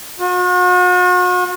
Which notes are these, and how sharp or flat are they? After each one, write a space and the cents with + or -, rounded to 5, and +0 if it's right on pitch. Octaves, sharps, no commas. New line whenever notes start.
F#4 -45